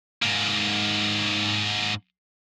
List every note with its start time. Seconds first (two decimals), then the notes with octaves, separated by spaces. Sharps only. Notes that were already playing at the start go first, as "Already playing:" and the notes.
0.23 G#2 A#3